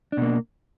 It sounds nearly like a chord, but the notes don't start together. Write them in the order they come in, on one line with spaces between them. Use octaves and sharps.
D4 B2 A#3